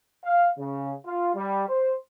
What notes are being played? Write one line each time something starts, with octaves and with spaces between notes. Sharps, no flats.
F5
C#3
F4
G3
C5